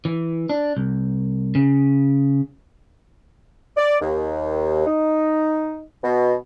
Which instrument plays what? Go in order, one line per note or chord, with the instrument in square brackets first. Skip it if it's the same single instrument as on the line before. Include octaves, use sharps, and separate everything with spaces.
[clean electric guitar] E3
D4
C2
C#3
[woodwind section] D5
D#2
D#4
B2